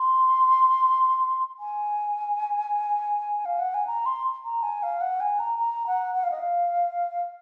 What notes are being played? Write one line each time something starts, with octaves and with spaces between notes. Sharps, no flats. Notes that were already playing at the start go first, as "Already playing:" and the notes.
Already playing: C6
G#5
F5
F#5
G#5
A#5
C6
A#5
G#5
F5
F#5
G#5
A#5
A#5
F#5
F#5
F5
D#5
F5